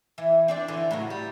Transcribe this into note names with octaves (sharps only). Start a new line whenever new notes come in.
E3
C4 D4 D5
D3 E3
A2 C#3 F#3
G3